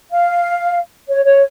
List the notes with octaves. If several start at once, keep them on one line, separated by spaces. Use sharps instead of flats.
F5
C#5
C#5